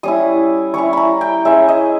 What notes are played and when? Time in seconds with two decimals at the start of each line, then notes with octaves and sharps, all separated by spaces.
0.03 G3 C#4 E4 D#6
0.74 G3 C#4 E4 C#6
0.93 A#5 B5
1.21 G5
1.45 G#3 C#4 E4 E5
1.69 D#5